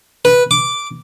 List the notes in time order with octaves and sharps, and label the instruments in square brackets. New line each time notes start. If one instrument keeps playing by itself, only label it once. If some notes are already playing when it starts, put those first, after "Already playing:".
[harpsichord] B4
D6